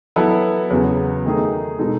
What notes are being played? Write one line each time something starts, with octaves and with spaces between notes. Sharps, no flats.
F#3 B3 E4 A4
E2 C#3 F#3 B3
D#3 A3 D#4 G#4
B2 G#3 D#4 A4